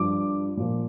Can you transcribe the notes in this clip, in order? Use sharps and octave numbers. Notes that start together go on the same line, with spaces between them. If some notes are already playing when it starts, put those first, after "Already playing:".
Already playing: G2 F3 D6
A#2 F3